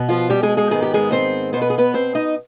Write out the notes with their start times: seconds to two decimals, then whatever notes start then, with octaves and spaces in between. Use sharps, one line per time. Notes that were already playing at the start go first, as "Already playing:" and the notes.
Already playing: B2 B3
0.09 F3 F4
0.30 G3 G4
0.43 G#3 G#4
0.57 G#3 G#4
0.71 G#2 D#3 B3 G#4
0.83 G4
0.94 G#3 G#4
1.12 C4 C5
1.53 B2 B3 C5
1.62 B4
1.70 G#4
1.78 B3 B4
1.94 C4 C5
2.15 D#4 D#5